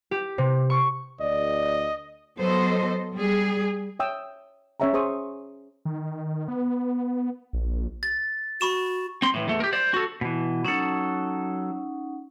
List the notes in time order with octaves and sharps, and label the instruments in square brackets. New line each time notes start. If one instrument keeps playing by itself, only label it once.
[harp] G4
C3
C#6
[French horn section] D2 D5 [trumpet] D#5
[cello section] F#3 B3 A4 C5 D#5
G3 G#4
[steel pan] C#5 E5 G5 D#6 E6
C#4 G#4 C#5 E5 G5 A#5
G#4 C5 C#6 D#6
[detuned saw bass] D#3
B3
A#1
[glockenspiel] A6
[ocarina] F#4 [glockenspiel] B5 C#6 E7
[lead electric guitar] C4 C6
A2 E3
E2 A3
G4 A#4
C5 D5
F#4 A4
[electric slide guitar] B2 E3
[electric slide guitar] F#3 A4 [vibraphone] C#4 D#4 F#5